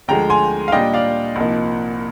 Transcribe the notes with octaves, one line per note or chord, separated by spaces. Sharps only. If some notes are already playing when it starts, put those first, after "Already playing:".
D2 D3 F3 G#3 G5 A#5
G#5 C6
F5
A#2 G3 D4 D#5 G5
D5 F5
C2 A#2 F3 A#3 D#4